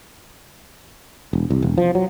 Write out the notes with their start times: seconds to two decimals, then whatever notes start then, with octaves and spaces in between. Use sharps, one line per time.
1.33 E1
1.50 C2
1.62 E1
1.78 F3
1.95 F#3